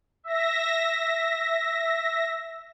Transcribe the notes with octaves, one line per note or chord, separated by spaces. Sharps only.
E5 A#6